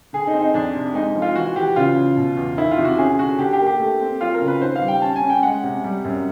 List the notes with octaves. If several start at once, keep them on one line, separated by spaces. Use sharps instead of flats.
D3 G#4
D#4
C4
D#4
F2 D4
C3
G#3 D#4
F3
F4
E3 F#4
E3 G4
C#3 F4
C#3
B2
E2
D#3 E4
F4
C3
F#4
C#4 G#4
D3 F#4
D3 G4
G4
A#3
G4
A3
C4
F#3 F4
A#4
C#3
B4
D#3 C5
F5
G3
G5
C#4 A5
G#5
C#4
G5
G#3 F#5
C3
G3
F#2